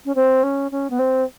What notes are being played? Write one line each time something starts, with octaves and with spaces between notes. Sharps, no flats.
C#4
C4
C#4
C#4
B3
C4